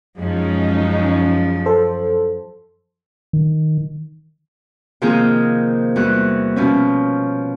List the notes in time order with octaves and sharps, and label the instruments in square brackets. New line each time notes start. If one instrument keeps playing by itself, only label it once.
[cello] F#2 F3 [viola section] G#3 C#4 D#4
[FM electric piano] A4 C5
[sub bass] D#3
[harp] C3 D#3 F3 A#3 F4 G#4
E2 G3 F#4 F#6
B2 F3 C#4